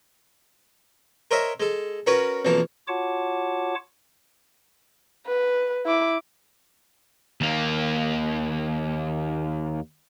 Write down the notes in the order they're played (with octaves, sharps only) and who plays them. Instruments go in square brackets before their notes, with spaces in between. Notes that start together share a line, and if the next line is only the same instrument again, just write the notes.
[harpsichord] A#4 C5 C#5 D#5 E5
G#3 A4
C#4 F#4 A#4 B4 C#5
B1 F2 E3 A#3 A5
[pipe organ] F4 F#4 C#5 F#5 A5 D6
[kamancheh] B4
E4 D6
[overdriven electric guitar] D#2 A#3